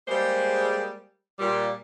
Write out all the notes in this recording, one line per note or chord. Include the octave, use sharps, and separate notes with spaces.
G3 G#3 A#3 G#4 C5
A#2 G3